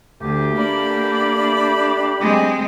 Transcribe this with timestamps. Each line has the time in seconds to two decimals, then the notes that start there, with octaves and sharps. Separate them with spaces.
0.21 D2 A3 G4
0.55 A#3 D4 B5
2.21 G#3 C4